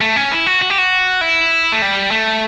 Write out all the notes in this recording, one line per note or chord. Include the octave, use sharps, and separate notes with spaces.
A3
C#4
E4
F#4
F#4
G4
F#4
E4
A3
G3
A3